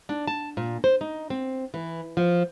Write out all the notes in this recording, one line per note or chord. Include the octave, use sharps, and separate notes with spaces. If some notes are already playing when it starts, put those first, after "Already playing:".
D4
A5
A#2
C5
D#4
C4
E3
F3